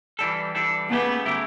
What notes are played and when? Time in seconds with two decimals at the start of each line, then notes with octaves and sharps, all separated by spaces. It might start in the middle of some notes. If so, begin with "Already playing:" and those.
0.19 E3 G3 D4 A4
0.55 E3 G3 D4 A4
0.90 C#3 F#3 A3 B3 E4 G4
1.26 C#3 F#3 A3 E4 G4